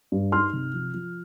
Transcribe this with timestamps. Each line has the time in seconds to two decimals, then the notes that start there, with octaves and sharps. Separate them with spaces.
0.12 G2
0.32 D#4 C6 F6
0.53 C3
0.74 F3
0.94 F3